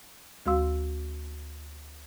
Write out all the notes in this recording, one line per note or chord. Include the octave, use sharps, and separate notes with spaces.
D2 G#3 F#4 F5 C6 E6